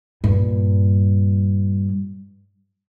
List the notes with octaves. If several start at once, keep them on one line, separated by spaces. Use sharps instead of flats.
G2 A#2